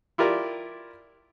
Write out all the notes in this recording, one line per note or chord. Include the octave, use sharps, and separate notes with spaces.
E4 F4 G4 A#4 D5